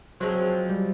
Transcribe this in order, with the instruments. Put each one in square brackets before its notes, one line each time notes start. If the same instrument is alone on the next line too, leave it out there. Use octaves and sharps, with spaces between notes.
[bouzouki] F3 G#3 C4 [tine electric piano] F#3
[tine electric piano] G3